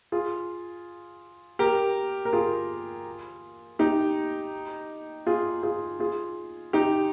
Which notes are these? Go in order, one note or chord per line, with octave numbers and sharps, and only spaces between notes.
F4 G#4
G4 A#4
A#4
F4 G#4
D#4 G4
F4 G#4
F4 G#4
F4 G#4
D#4 G4